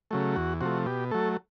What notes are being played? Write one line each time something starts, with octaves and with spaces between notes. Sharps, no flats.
C#3 F#3 A3
E2 F#4
C3 F3 A3 F#4
B2 G4
F#3 A3 A4